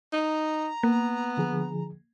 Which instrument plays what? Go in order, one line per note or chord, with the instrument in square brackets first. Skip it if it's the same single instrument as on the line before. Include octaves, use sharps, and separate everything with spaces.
[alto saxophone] D#4 [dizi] A#5
[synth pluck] A#3 [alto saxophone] B3
[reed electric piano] D3 F3 G#4